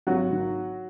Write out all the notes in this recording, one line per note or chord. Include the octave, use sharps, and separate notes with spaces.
G#1 F#3 F#4
D#3